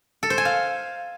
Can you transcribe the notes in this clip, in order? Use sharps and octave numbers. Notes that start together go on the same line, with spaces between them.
A4
C5
G#5
F5